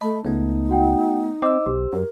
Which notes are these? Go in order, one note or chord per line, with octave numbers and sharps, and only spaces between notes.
A3 D#5 A5 B5
C#2 A3 B3 D#4
F#4 F#5 G5
C4 C5 D#5 D6 E6
B1 G4
F#2 A#4